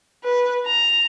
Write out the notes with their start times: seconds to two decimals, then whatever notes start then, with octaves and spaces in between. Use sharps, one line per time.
0.24 B4
0.66 A#5